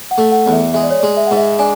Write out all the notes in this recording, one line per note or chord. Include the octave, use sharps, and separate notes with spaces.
F#5
A3
F#5
E2
E5
G#3 E5
D5
C#5
G#3 D5
E5
G#2 F#5
E5
D4 G#5